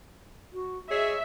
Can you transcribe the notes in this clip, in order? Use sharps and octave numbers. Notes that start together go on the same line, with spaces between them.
F#4
G#4 C#5 D#5 E5